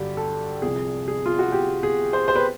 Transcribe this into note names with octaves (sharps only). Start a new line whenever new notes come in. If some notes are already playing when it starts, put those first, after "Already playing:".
Already playing: G2 D3 F#3 G4
A4
C2 C3 F3 G#4
G#4
F4
F#4
G4
G#4
C5
C5
B4